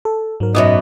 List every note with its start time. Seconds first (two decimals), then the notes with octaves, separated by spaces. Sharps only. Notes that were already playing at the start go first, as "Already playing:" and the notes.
0.05 A4
0.40 G#2 F#3 A#4
0.55 F#2 B2 B3 D#4 D#5 D6 D#6